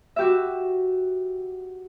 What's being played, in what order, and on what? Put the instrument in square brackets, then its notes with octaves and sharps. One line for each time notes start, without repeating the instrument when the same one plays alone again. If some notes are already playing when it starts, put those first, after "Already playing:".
[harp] F#4 G4 E5